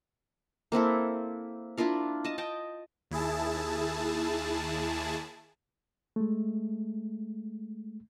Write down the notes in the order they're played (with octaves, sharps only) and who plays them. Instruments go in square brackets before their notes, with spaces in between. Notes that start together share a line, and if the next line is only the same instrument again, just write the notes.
[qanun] A#3 C4 E4 A4
D4 E4 F4 A#4
D#5 A5
D#5 G5 A5
[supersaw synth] D#2 E4 G#4 A5
[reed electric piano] G#3 A3